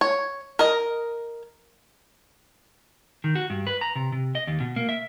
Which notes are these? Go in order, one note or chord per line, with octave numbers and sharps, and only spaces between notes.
C#5
A#4 D#5
D#3
F#4
G2
B4
A#5
C3
C3
D#5
D#2
B2
A#3
E5